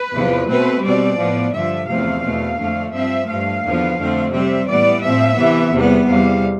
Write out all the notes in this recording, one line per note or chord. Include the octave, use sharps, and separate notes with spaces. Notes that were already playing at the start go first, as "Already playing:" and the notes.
Already playing: B4
E2 C3 F3
B2 A3 C4 B4
B2 G3 C4 D5
A2 F3 B3
G2 D3 F3 E5
E2 C3 F3 A3 C4 F5
E2 B2 A3
F2 D3 A3
G2 F3 C4 E5
G2 F3 A3 F5
E2 D3 F3 B3
F2 D3 A3 C4
C3 G3 C4 E5
A2 E3 G3 B3 D5
A2 F3 C4 E5
C3 E3 B3
E2 C3 G3 B3
E2 C3 G3 F5